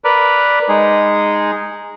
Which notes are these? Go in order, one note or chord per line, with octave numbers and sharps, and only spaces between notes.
A#4 B4 D5
G#3 D#4 G#4